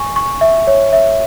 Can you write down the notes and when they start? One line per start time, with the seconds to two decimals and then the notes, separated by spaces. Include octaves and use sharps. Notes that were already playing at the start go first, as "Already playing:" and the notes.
Already playing: G#5 C#6
0.16 C#6
0.41 E5
0.67 C#5
0.93 E5